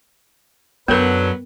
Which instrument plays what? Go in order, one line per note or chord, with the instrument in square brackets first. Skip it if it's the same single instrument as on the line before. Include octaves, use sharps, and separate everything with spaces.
[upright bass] F#2 [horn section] D3 F#3 [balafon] B3 A#4 [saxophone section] B4